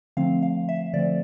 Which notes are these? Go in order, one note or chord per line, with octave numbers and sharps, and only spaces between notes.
D3 F3 A3 C4 F5
F5
E5
D3 F3 A3 C4 D5